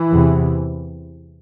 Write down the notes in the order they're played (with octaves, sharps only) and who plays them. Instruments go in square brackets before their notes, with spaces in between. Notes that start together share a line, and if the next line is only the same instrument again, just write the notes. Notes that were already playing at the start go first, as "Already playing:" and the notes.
Already playing: [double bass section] E3
E2 C3